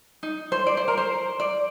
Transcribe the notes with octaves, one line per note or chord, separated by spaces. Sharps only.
D#4
C5
D5
C5
A#4
C5
D5